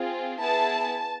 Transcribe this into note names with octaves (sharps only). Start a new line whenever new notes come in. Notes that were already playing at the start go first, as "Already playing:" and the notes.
Already playing: C4 F4 G#4
B3 E4 G#4 A5